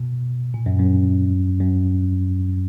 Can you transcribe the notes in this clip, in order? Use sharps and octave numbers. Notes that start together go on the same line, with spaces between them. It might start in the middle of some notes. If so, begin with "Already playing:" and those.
Already playing: B2
A#2
F#2
F#2
F#2